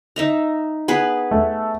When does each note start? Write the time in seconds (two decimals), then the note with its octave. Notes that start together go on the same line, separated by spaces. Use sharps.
0.16 D#4 E5 A#5
0.88 B3 G#4 B4
1.31 A3